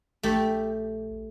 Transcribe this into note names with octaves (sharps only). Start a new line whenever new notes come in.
A#1 A3 G4